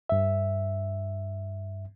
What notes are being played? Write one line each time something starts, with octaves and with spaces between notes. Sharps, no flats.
G2 E5